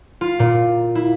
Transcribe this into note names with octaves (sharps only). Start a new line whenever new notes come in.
F4
A#2
E4